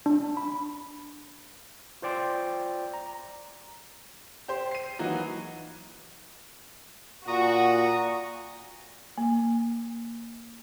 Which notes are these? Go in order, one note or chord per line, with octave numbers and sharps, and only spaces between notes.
D4
B5
F4 C5 D5 G5 C6
A#5
G4 C5 C6
C7 D#7
E3 F#3 A#3 D#4 F#4
A#2 F#4 A#5 C#6 D#6
A#3